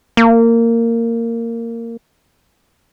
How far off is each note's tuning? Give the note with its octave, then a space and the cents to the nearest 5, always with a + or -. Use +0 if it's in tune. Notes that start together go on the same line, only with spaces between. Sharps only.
A#3 -15